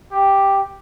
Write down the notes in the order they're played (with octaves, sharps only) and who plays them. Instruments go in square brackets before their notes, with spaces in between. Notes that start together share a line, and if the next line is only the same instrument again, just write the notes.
[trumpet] G4